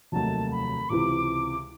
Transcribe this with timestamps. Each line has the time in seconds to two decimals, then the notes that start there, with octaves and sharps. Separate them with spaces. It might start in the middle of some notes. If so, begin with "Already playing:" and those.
0.12 F1 D#2 D#3 F#3 A3 A5
0.52 B5
0.89 C#2 C3 E3 D6